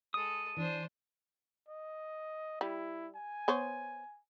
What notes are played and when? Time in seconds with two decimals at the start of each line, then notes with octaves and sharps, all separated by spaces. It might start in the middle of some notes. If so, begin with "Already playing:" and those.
0.14 G#3 A4 D#6 D#7
0.57 E3 D4 C5
1.68 D#5
2.61 G3 E4
3.15 G#5
3.48 B3 C5 C#5